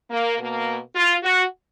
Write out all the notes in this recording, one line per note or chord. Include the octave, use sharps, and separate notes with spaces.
A#3
B2 A#3
F4
F#4